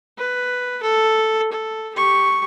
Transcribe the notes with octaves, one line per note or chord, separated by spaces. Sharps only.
B4
A4
A4
G4 C#6